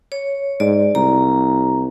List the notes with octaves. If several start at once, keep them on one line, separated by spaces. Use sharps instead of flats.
C#5
G#2 D5
C2 A#5